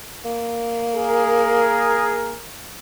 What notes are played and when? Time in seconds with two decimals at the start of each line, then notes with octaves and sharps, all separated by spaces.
0.25 A#3
0.93 G#4 A#4